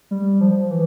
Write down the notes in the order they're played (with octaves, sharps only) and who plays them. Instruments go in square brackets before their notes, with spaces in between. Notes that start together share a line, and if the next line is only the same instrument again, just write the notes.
[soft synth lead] G3
F3
E3